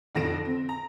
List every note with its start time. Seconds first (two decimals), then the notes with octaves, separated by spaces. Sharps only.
0.15 F1 F2 D3 A#6 D7 E7
0.45 C4
0.69 A#5